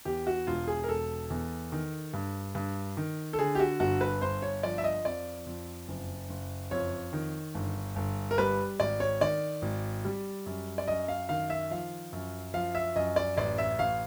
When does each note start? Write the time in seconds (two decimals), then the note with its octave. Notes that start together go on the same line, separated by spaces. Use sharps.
0.05 E2 G4
0.27 F#4
0.47 E1 F4
0.67 G#4
0.84 A#4
0.88 E1 A4
1.30 E2
1.72 D#3
2.13 G2
2.55 G2
2.97 D#3
3.33 A4
3.38 D3 G#4
3.55 G4
3.59 F#4
3.80 G1 F#4
4.01 B4
4.22 G1 C5
4.42 C#5
4.63 F3 D5
4.78 E5
4.84 D#5
5.05 F2 D5
5.46 F2
5.88 F#1
6.29 F#1
6.71 F2 C#5
7.13 D#3
7.55 G1
7.96 G1
8.31 A#4
8.38 G3 B4
8.79 G#1 D5
9.00 C#5
9.21 D#3 D5
9.62 G#1
10.05 G3
10.46 F#2
10.78 D5
10.88 F#2 D#5
11.08 F5
11.29 D#3 F5
11.50 E5
11.71 F3 F5
12.13 F#2
12.54 F3 F5
12.75 E5
12.96 F#2 D#5
13.16 D5
13.37 A1 D5
13.58 E5
13.79 A1 F5